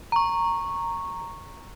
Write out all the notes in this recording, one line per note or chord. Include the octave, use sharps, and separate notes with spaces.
A#5 C#6